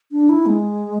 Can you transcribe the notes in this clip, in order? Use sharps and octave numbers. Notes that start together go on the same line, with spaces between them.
D4
E4
G#3